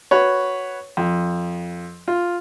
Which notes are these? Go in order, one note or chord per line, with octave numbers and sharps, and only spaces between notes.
F#4 B4 C#5
F2
F4